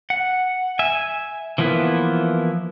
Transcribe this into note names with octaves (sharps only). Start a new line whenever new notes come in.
F#5
E5 G#5
E3 F3 A#3 B3 E4